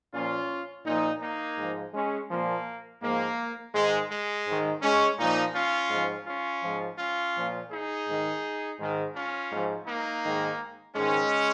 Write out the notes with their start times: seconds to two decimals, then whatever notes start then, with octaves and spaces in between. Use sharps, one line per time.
0.14 A#2 F3 C#4 F4
0.86 A#2 F3 A#3 D#4
1.22 A#3 D#4
1.58 G#2 F3
1.94 G#3 C#4
2.30 A#2 F3 A#3
3.03 G#2 F3 A#3
3.75 G#2 D#3 G#3
4.10 G#3
4.46 G#2 D#3
4.83 G#3 C#4
5.18 A#2 F3 A#3 D#4
5.55 C#4 F4
5.90 G#2 F3
6.27 C#4 F4
6.63 G#2 F3
6.99 C#4 F4
7.35 A#2 F3
7.71 D#4 G#4
8.07 G#2 D#3
8.79 G#2 D#3
9.15 C#4 F4
9.51 G#2 F3
9.87 A#3 D#4
10.23 G#2 D#3
10.95 G#2 D#3 G#3 C#4